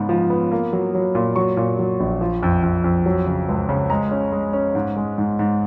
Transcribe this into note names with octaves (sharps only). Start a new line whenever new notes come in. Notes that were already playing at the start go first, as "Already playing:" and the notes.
Already playing: G#2 C#3 B3
F3
B3
A#3
F#3
F#3
A#2
F#3 C#6
A#2
F#3
A#1
F3
F2
F2
F2
F#3
C#3
C#2
C#3
G#3 A#5
C#4
G#3
C#4
G#2
G#3
G#2
G#2